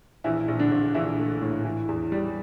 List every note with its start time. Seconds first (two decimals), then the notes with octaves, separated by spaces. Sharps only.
0.24 A#1 E3 E4
0.48 A#1
0.59 D3 D4
0.71 A#1
0.94 A#1 E3 E4
1.18 A3
1.42 A2
1.65 E3
1.89 E2
2.12 G3